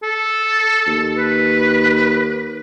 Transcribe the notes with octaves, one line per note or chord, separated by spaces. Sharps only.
A4
D#2
B4